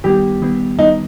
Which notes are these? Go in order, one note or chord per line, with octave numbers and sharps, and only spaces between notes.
D#3 G3 B3 G4
D#3 G3 B3
D#3 G3 B3 D#4